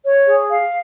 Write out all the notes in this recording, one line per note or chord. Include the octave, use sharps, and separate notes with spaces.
C#5
G#4
F5